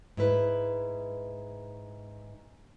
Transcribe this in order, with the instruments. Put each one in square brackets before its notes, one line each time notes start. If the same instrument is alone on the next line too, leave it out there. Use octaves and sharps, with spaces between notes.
[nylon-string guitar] G#2 E4 B4